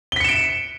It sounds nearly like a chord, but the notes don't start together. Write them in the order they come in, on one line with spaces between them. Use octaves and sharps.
G7 B6 C#7 E7 D7